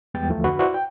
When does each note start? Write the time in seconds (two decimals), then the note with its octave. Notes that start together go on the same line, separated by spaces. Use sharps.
0.14 E2 G3 G#3 B3 G5 A6
0.29 D2 E3 F3 A3
0.44 F2 D3 F#4 B4 B5
0.59 E4 F#4 B4 C5 D5
0.74 G5